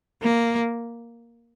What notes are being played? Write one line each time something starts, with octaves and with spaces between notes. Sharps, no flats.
A#3